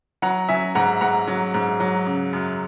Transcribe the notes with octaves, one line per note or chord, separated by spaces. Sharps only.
F#3 F#5 A#5
F#3 E5 G#5
G#2 F#5 A#5
G#2 F#5 A#5
F#3
G#2
F#3
C#3
F#2